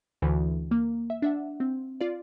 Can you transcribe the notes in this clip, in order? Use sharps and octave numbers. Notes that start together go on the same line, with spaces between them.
D2 D3 E3
A#3
E5
D4 E5 F#5
C4
F4 D5